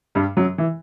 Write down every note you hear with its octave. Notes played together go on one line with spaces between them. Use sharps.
G2 G3
F#2 F#3
E3